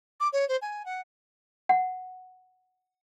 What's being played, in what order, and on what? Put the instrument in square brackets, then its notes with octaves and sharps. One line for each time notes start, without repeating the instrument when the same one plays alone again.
[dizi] D6
C#5
C5
G#5
F#5
[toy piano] F#5